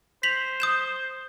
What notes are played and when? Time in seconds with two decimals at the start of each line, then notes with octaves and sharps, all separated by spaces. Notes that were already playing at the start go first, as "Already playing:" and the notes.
0.23 C5 B6 F7 F#7
0.60 D#6 G6 E7